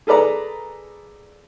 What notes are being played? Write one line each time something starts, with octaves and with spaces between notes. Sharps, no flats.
G#4 A4 B4 D5 A#5